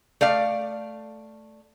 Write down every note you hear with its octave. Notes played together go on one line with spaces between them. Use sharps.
A3 D5 F5